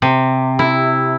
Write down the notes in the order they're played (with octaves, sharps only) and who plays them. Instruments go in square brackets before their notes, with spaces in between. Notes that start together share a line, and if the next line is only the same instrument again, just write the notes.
[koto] C3
E4